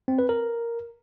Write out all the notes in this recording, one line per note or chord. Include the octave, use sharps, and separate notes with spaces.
C4
B4
A#4